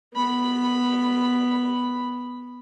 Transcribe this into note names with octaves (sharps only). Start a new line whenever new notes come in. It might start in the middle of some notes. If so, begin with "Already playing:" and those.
B3 B5